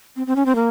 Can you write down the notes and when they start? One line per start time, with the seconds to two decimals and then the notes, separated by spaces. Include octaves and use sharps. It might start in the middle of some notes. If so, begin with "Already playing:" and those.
0.16 C4
0.27 C4
0.36 C#4
0.46 C4
0.56 A#3